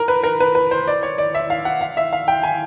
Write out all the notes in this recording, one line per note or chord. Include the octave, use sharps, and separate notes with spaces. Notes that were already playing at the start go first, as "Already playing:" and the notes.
Already playing: A#4
B4
A#4
B4
B4
C5
D5
C#5
D5
E5
F5
F#5
F5
E5
F5
G5
G#5